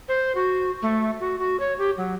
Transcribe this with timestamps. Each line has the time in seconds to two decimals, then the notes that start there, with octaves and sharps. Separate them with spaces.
0.08 C5
0.35 F#4
0.82 A3
1.20 F#4
1.39 F#4
1.60 C#5
1.78 G4
1.97 F#3